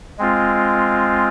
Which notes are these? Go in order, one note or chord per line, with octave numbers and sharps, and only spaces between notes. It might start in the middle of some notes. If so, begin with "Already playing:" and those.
G#3 C4 F4